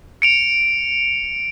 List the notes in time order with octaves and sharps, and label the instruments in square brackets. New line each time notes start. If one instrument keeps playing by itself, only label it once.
[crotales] C#7 D7 F7